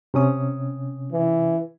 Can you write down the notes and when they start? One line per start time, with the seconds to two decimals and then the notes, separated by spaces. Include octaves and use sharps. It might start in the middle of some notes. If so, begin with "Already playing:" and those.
0.14 C3 C#4 D#6
1.12 E3